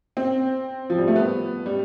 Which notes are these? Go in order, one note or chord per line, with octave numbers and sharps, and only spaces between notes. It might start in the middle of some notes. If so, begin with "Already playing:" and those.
C4
F3
G3
A3
B3
G3